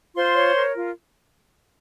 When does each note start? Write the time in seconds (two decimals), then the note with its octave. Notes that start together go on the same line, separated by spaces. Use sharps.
0.16 F4 C5 C6
0.35 C#5
0.55 A#4
0.75 F4